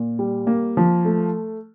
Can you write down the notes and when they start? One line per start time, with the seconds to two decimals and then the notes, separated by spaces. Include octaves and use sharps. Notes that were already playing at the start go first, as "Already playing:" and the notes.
Already playing: A#2
0.19 G3
0.47 A#3
0.77 F3
1.05 A3